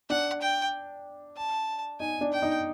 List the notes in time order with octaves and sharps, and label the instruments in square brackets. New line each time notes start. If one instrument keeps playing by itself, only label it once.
[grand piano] D4 [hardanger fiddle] F#5
[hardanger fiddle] G5
A5
[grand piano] D#4 [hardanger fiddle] G#5
[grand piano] D4
[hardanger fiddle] G5
[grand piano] D#4